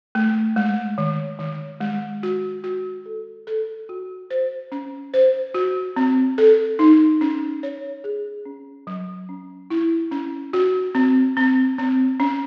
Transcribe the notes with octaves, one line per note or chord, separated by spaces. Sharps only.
A3
G#3
D#3
D#3
G#3
F#4
F#4
A4
A4
F#4
C5
C#4
C5
F#4
C4
A4
D#4
C#4
C#5
G#4
C#4
F#3
C#4
E4
C#4
F#4
C4
C4
C4
C#4